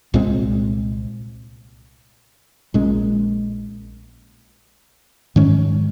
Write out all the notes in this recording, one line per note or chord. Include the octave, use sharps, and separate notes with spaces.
C2 A#2 G#3 C4
A#1 A#2 G#3 C#4
G#2 D#3 G#3 C#4